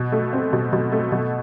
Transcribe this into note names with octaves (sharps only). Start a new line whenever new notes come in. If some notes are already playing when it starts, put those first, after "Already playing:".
Already playing: B2
A3
C4
B2
B2
A3
B2